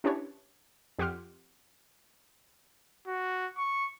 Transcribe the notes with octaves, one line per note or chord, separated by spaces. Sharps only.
C#4 D4 E4 G4 B4 C#5
F2 G4 F#5 C6 D6 F6
F#4
C#6